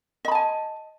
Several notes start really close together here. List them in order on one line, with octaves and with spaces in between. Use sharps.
D#5 B5 A5 G#5